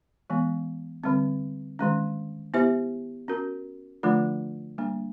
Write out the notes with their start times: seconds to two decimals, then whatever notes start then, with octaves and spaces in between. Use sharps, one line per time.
0.30 E3 G#3 B3
1.04 D3 G3 C4
1.79 D#3 G#3 C#4
2.54 B3 E4 G4 C5 E5
3.28 C#4 F#4 A#4
4.03 D3 F3 A3 D4 F4
4.78 G3 A#3 D4